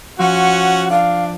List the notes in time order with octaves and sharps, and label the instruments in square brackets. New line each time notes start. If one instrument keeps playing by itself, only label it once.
[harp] F3 [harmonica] C#4 F#5 [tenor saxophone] F#4
[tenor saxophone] D4 [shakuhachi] F5